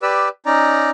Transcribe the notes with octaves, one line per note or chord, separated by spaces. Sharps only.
G4 B4 D5 E6
C#4 D#4 D5 A#5